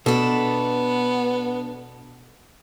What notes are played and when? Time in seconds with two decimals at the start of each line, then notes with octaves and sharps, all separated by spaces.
0.06 B2 B3 D4 A4